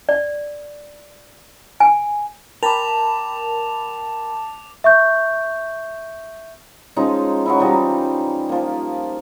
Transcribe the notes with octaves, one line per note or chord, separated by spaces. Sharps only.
D5
G#5
A#4 G5 A5 B5 D6 F7
E5 C#6 G6
F3 G#3 C#4 D#4
F#3 D#4 E4
E3 F3 G3 D#4
F3 A#3